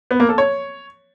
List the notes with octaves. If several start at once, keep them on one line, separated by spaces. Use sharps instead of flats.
B3
A#3
A4
C#5